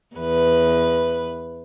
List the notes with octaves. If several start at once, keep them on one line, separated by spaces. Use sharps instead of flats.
E2 B4